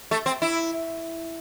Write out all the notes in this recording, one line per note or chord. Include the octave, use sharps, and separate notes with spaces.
A3
C4
E4